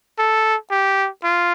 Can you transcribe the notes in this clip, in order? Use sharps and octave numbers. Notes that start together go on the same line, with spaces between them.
A4
G4
F4